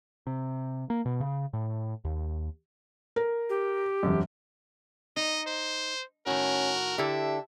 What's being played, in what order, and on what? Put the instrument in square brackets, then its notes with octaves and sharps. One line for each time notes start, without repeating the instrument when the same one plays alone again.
[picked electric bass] C3
A#3
B2
C#3
A2
D#2
[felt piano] A#4
[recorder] G4
[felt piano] E1 F#2
[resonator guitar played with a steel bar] D#4 [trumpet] D#5
[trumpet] C5
[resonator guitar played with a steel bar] A2 D#3 [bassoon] C#4 [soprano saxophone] F#4 [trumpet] A#4
[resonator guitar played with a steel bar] D3 E4 A4 [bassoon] G4 [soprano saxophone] E5